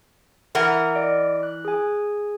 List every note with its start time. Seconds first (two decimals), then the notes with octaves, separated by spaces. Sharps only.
0.55 E3 A#4 E5 F#5 A#5
0.95 D5 D#5 D7
1.43 F#6
1.65 G#4 G#5